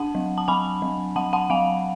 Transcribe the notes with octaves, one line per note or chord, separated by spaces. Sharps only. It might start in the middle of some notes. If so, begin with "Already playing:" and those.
Already playing: D4 F#5 A5
F#3
A5
F#3 G#5 B5
F#3
F#3 F#5 A5
F#5 A5
F#3 F5 G#5